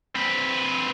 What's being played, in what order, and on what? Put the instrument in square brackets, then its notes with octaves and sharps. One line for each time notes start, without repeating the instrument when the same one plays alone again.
[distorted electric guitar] C4 B4